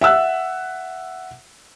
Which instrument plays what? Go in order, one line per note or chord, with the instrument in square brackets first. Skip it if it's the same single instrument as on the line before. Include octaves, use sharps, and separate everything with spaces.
[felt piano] E5 F#5 E6 F#6